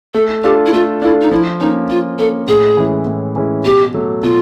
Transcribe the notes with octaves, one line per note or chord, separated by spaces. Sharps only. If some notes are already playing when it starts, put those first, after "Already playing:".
A3 A4
D4 F4 G4 A4
E4
A3 F4
D4 E4 F4 A4
D#4
F3 E4
A#3 C#4 D#4
F3 F4
A#3 C#4 A4
A2 G#4
E3 G#3 C#4 E4
A2
E3 G#3 C#4 E4
B2 G4
F#3 A3
B2 F4